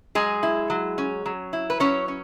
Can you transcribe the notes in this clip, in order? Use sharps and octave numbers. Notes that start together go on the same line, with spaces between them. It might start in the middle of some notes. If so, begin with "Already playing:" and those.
F#3 G#3 G#4
E4
F#3
C#4
F#3
E4
B4
F#3 C#4 C#5
C#4